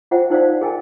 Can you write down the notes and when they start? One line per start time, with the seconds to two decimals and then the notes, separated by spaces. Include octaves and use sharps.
0.11 F4 C5 E5 F#5 G5
0.30 D#4 C5 D5 F5
0.61 G#4 A#4 D#5 G5 G#5